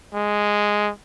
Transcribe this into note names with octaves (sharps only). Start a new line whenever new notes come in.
G#3